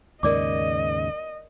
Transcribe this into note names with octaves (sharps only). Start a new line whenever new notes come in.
D#2 G#2 C#3 A#4 D5 D#5 D6